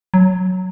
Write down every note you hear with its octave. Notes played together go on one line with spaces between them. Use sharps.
F#3